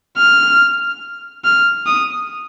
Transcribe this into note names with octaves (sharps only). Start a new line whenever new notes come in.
F6
F6
D#6